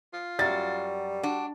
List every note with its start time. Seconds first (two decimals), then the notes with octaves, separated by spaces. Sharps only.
0.14 F4
0.39 F#2 G3 F#4 A6
1.23 D4 F#4